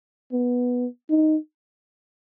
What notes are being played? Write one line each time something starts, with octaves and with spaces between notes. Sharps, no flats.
B3
D#4